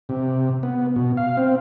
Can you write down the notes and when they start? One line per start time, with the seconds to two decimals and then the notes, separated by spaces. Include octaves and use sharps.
0.09 C3
0.63 B3
0.96 B2
1.17 F5
1.37 C4